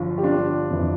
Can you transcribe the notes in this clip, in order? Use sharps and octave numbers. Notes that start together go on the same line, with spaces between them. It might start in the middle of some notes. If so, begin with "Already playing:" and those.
Already playing: G1 F3
G4
G1 D4 F4
F2 E3